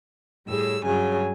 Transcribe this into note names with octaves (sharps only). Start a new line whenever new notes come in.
A2 G3 G#4 E6
G2 C#3 F#3 G#5